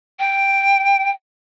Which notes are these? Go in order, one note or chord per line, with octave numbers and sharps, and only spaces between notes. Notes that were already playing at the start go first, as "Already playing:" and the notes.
G5